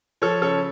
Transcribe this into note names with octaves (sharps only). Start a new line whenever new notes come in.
F3 A4 C#5
C#3 A4 C#5